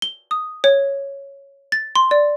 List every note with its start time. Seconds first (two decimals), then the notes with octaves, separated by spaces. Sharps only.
0.02 G7
0.31 D#6
0.64 C#5
1.72 A6
1.96 C6
2.11 D5